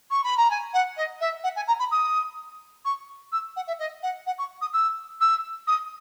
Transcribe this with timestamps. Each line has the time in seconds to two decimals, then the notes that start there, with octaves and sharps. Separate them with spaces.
0.10 C#6
0.24 B5
0.37 A#5
0.50 G#5
0.73 F#5
0.97 D#5
1.20 E5
1.43 F#5
1.56 G#5
1.67 A#5
1.79 B5
1.91 D#6
2.85 C#6
3.32 E6
3.56 F#5
3.67 E5
3.79 D#5
4.03 F#5
4.26 F#5
4.38 C#6
4.61 D#6
4.73 E6
5.21 E6
5.67 D#6